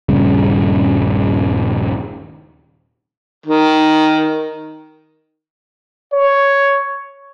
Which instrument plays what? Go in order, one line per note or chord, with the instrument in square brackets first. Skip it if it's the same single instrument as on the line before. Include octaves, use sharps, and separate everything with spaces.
[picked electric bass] D#1 G2 C#3
[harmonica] D#3
[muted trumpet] C#5